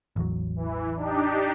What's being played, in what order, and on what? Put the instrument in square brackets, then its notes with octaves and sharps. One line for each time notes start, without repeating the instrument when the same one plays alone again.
[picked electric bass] A1 E2 F#3
[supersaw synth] E3
D4 D#4 G4